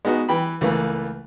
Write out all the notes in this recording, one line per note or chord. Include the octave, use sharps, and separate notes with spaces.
G#3 B3 D#4 F#4
E3 G5 B5
C#2 E3 A3 A#3